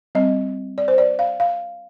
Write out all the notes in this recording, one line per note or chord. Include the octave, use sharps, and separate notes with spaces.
G3 C4 D#5
D5
C5
D5
F5
F5